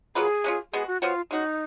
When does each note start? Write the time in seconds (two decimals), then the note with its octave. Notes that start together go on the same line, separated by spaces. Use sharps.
0.15 F#3 A#3 F4 G#4 B4
0.44 G#3 C#4 F4
0.73 G#3 B3 F#4 G#4
0.87 F#4
1.01 F3 B3 F4 F#4 C#5
1.31 G#3 C#4 D#4 F#4